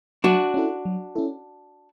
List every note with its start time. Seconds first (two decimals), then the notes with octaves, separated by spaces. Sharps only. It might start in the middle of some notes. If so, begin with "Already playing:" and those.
0.24 F#3 D4 F#4
0.54 C#4 E4 A4
0.85 F#3
1.15 C#4 E4 A4